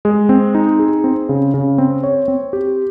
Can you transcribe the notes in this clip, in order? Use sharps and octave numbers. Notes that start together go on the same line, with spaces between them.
G#3
C4
D#4
G#4
C4
C#3
C#3
C4
C#5
C4
G4